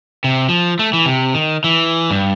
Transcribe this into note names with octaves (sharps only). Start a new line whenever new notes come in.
C3
F3
A3
E3
C3
D#3
E3
G2